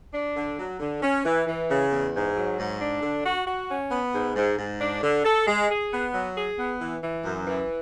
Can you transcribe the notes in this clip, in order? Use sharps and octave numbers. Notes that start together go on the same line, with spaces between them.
D4
D3
F#3
D3
C#4
E3
E3
C#3
E2
G#2
F#3
G#2
D4
D3
F#4
F#4
C#4
B3
G#2
G#2
G#2
D4
D3
A4
G#3
G#4
B3
F#3
G#4
B3
E3
E3
F#2
E3